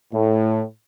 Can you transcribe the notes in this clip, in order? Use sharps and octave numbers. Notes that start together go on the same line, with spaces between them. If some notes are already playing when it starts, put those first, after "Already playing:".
A2